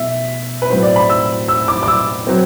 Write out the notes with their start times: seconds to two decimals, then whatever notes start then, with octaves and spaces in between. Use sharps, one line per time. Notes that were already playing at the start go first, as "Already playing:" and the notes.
Already playing: B2 A3 E5
0.62 B4
0.70 A2 F#3 C4 C5
0.83 D5
0.96 B5
1.09 E6
1.48 E6
1.68 D6
1.83 D6
1.88 E6
2.27 F#3 C4